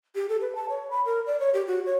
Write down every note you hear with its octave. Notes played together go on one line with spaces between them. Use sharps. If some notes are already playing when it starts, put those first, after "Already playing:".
G4
A4
B4
A5
C#5
B5
A#4
D5
C#5
G4
F#4
C#5